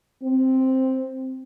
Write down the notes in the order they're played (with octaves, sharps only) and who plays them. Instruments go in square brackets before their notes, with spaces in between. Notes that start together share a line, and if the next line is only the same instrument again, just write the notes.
[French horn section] C4